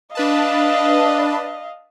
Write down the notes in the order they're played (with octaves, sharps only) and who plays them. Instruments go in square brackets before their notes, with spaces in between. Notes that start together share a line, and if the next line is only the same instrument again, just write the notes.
[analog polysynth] D4 B4 A5 [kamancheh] D#5 F5